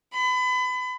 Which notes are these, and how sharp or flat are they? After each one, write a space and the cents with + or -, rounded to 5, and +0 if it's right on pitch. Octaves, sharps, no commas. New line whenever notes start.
B5 +30